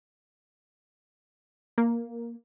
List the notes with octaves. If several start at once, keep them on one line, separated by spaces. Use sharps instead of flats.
A#3